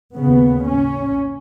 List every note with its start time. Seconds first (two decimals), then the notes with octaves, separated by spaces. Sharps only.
0.16 D#2 C#3 B3
0.65 C#4